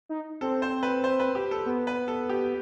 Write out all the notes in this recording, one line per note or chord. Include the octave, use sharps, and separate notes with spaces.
D#4
C4 A4
C5
B4
C5
B4
G4
A4
B3
B4
A4
G4